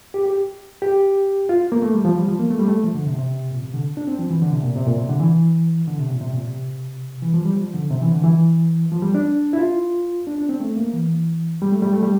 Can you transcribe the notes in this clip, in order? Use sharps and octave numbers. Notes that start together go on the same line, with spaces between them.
G4
G4
G4
F4
A#3
A3
G3
F3
G3
F3
A#3
A3
G3
A3
F3
D3
C3
C3
A#2
C3
D3
D4
C4
F3
E3
D3
C3
A#2
C3
A#2
C3
D3
E3
D3
C3
A#2
C3
A#2
C3
E3
F3
G3
F3
D3
C3
E3
D3
E3
F3
G3
D4
E4
F4
D4
D4
C4
A3
A#3
E3
G3
A3
G3
A3
G3